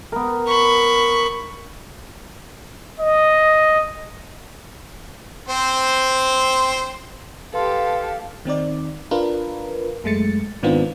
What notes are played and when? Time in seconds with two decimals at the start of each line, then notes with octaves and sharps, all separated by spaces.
0.12 B3 A#4
0.48 B5 C#6
2.99 D#5
5.48 C4 C5
7.54 G4 A4 B4 F5 C6
8.45 D#3 C4 D#4 D5
9.11 D4 F4 A#4 B4
10.04 F#2 G#3 A3 A6 C#7
10.63 G#2 D#3 B3 C4 D4 F4